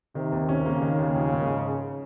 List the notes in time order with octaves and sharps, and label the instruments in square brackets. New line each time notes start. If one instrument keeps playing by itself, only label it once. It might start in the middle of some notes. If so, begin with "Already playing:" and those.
[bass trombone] C3 [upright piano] D#3
[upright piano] D#2
C#4
[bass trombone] C#3 [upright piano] A#3
[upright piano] D#3
D#2
F3
G#2